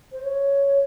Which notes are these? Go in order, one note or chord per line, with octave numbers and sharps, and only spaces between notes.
C5
C#5